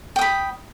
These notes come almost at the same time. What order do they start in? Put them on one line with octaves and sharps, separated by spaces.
G5 D#6 B5